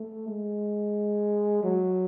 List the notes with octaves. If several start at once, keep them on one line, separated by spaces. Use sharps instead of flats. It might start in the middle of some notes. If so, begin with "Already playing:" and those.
Already playing: A3
G#3
F#3